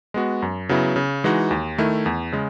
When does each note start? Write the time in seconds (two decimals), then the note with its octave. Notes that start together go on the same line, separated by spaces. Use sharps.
0.14 G#3 B3 F#4
0.42 F#2
0.69 C#3 F#3 B3 E4
0.96 C#3
1.24 E3 G#3 D#4 F#4
1.51 D#2
1.78 D#3 A3 E4
2.06 E2
2.32 C#3 G#3